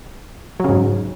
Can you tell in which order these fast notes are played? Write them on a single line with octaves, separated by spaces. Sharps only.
F#3 C#3 G#2